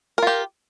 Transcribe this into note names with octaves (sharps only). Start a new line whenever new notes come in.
F4 G4 A#4